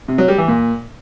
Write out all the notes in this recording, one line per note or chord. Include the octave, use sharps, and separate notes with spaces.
C3
F#3
G3
E3
A#2